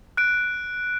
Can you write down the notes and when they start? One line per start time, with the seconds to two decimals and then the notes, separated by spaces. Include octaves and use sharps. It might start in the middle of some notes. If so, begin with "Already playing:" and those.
0.17 F#6 D7